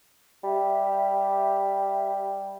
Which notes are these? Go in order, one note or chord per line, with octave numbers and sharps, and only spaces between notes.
G3 G4 E5